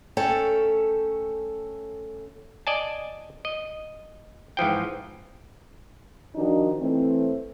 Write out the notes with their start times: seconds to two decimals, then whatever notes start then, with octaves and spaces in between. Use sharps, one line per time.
0.17 A3 C#4 A4 G5
2.67 D5 D#5 G#5 A5
3.45 D#5
4.57 G#2 E3 F3 G5
6.35 D#3 F3 D4 D#4 F#4
6.79 E3 A3 C4